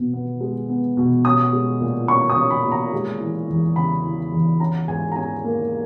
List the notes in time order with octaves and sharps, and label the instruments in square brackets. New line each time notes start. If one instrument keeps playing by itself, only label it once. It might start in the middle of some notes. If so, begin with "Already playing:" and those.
Already playing: [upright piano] B2 B3
B3
G#3
B3
B2
C#4 D#6
G#3
A#2
C#4 C#6
D#6
C#4
B5
A#2
A#5
G#3
E3
E2
C#3 B5
E3
E2
C#4 A#5
G#2 G#5
A#5
C#4 G#5
A#3